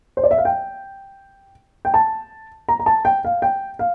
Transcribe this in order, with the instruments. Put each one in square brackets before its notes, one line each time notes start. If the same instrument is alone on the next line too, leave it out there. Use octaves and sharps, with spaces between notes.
[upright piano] C5
D5
E5
F5
G5
G5
A5
A#5
A#5
A5
G5
F5
G5
F5